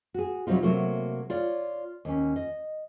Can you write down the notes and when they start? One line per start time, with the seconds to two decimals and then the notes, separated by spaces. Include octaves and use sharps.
0.14 F#4 G#4
0.47 C3 F#3 G3 C4 D#4 F4
0.63 C3 F#3 A3 A#3
1.30 F4 C#5 D5 F5
2.05 D#2 C#4
2.36 D#5